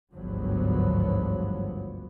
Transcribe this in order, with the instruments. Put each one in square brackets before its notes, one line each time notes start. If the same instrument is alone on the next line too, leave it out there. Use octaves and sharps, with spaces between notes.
[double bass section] G#1 D2 G2 F3 F#3 B3